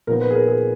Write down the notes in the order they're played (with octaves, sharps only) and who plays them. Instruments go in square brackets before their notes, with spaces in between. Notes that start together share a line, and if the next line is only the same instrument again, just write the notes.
[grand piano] A#2 F3 B3 D#4 A#4
B4
G#4
A#4
G#4